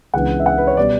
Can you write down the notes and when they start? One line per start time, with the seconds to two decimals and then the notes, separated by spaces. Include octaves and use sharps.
0.13 C#2 C#3 E3 B3 D4 F#5
0.40 E5
0.46 F#5
0.58 B4
0.67 C#5
0.77 B2 G3 D5